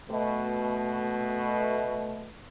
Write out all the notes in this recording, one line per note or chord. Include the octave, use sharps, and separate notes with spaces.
B2 A3